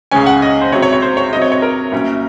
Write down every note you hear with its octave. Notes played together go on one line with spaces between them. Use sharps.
C#2 C#3 G#3 C#4 G#5
F#5
D#5
C5
C#2 C3 F#3 C#5
C#5
C#5
C5
C#5
C3 F#3 C4 D#5
C#5
C#5
A#4
C2 A#2 F#3 C#4